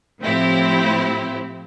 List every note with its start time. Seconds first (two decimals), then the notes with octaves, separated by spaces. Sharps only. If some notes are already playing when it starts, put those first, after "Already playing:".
0.21 A2 F3 C4 E4 G4